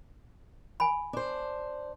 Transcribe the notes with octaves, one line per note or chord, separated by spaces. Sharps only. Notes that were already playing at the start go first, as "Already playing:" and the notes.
G#5 B5
D4 C5